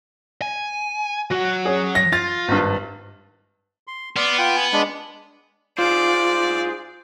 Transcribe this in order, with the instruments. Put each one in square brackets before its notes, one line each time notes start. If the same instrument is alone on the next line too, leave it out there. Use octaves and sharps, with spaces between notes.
[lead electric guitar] G#5
[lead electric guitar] F#3 F#5 [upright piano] F#4
[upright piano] C#4 G#4
A#6
[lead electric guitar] F4 [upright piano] A6
[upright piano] G#1 G2
[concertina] C6
[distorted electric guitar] B3 [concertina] D5 C6 F6
[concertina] F4 G5
G#5
G#3 D4
[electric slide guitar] F4 [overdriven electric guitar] G#4 C5 [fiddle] D5